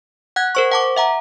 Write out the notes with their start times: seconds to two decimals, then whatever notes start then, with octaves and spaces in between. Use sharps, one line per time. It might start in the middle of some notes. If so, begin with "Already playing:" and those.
0.36 F#5 F#6 G#6
0.55 A#4 C5 C#6
0.72 F#5 A5 D6
0.96 E5 F#5 A#5